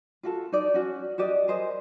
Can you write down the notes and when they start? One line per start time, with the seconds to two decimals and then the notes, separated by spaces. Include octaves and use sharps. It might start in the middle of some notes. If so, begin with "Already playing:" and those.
0.23 F4 F#4 A4
0.52 D#4 D5
0.74 C#4 F#4
1.18 F#4 G4 D5 D#5
1.48 G#4 A#4 C5 D#5